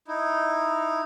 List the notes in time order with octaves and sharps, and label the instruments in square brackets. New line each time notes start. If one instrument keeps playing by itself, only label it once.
[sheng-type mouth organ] D#4 E4